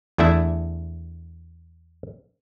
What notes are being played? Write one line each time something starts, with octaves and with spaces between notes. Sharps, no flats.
E2 A3 D4 E4 E5